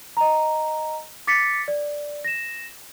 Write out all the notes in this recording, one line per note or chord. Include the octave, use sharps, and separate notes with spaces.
D#5 A#5
D6 A6 B6 C#7
D5
A#6 E7